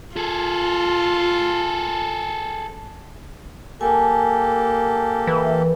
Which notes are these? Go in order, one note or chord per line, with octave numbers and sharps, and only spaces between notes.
F4 G#4 A4
A#3 G4 A4 G#5 A5
E3